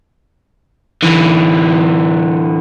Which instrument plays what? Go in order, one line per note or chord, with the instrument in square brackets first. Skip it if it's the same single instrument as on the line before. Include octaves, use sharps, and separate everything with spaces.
[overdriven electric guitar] D3 E3